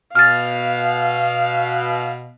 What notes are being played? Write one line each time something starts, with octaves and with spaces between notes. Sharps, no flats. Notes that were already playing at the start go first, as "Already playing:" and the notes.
B2 F5 F6 A6